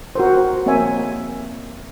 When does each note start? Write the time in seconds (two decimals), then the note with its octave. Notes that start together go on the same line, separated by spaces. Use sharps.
0.15 F#4 A#4 C5
0.66 A#3 C4 C#5 E5 G#5